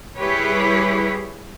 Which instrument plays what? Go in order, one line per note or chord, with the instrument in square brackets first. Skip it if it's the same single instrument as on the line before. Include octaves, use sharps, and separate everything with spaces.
[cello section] G3 E4 G4 G#4 B4 C#5